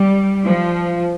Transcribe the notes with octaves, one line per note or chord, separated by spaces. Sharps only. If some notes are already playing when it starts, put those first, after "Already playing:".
Already playing: G3
F3